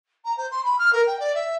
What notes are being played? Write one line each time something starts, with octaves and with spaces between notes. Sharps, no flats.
A#5
C5
C6
B5
F6
A#4
G5
D5
E5